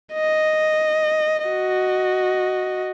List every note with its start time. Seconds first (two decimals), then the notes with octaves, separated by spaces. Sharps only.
0.14 D#5
1.45 F#4 D#5